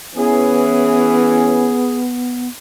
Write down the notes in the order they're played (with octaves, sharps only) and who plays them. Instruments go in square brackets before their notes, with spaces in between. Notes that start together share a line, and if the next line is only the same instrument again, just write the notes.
[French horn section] E3 C#4 [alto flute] B3 [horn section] G#4